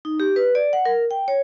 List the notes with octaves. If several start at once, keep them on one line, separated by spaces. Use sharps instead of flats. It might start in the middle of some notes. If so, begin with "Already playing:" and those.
D#4
G4
B4
D5
F#5
A#4
G5
C#5